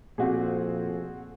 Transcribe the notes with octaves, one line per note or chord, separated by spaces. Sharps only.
F2 A#2 C4 F#4 G#4